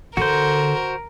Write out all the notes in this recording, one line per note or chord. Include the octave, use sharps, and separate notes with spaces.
D3 F#4 A4 A#4 C5